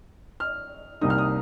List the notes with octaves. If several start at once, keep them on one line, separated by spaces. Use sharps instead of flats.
F6
C2 C3 G3 A#3 D#4 D#6
F6
D#6